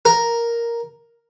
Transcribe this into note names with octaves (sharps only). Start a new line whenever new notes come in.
A#4